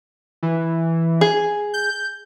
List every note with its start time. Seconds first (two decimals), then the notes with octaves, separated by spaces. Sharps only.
0.43 E3
1.21 G#4
1.74 G6